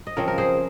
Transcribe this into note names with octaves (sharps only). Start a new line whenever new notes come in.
D#5
C#3 F3 C4 A#4 C#5
A#4
G#4 C5